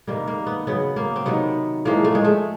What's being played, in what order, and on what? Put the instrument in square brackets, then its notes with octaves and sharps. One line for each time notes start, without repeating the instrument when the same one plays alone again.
[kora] C3 D#3 G3 A#3
A#3
B3
C#3 F#3 B3
A#3
C4
C3 D#3 F#3 B3
A2 F3 G#3 A#3
A3
G#3
A3